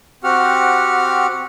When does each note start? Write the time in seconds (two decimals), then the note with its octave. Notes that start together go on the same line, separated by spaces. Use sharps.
0.24 C4 F#4 G4 F#5 F6